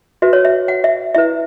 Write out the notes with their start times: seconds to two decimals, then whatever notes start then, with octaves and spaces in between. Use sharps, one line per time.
0.22 F#4 B4 E5
0.33 C#5
0.45 E5
0.68 F#5
0.84 E5
1.15 E4 B4 E5